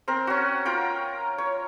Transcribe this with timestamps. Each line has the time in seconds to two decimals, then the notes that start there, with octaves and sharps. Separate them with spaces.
0.08 C4 A#4
0.27 C#4 F#4
0.66 F4 A#4 G5
1.38 C#5